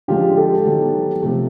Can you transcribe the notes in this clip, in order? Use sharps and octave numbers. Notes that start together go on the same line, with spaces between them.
D3 F3 G#3 F4 G4
G4 A4
D#3 F#3 B3
C3 F3 A3